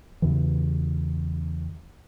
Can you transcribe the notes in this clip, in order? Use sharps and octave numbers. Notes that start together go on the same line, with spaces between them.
E2 C#3 E3